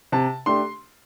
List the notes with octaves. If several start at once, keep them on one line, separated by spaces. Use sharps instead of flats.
C3 A5
A3 D4 G4 C6